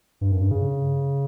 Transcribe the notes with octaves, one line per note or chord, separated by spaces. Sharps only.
G2
F#2
G2
C#3